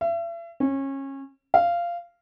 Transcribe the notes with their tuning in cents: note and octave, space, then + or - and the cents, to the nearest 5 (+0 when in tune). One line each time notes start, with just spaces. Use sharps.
E5 +40
C#4 -25
F5 -15